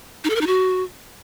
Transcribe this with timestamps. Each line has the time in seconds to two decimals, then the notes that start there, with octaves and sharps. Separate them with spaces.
0.24 D#4
0.30 A4
0.36 A#4
0.41 D#4
0.47 F#4